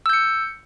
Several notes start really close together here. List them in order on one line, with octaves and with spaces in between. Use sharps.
E6 G6 C#7